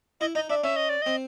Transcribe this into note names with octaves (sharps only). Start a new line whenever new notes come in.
E4 D#5
D#4 D#5
D4 E5
C#4 E5
D#5
D5
C4 D#5